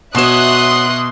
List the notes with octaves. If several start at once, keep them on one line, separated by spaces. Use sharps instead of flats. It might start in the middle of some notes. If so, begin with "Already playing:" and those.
B2 F#4 C#5 E5 C6 D#6 F#6 E7